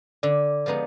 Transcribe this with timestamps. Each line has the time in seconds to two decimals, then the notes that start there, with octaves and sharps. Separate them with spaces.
0.23 D3 D5
0.66 F3 G#3 B3 D#4